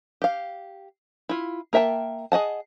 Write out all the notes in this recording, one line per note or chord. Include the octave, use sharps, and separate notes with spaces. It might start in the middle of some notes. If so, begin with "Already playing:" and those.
G4 F5
E4 F4
A#3 A#4 E5 G5 A5
G#4 D#5 F#5 A5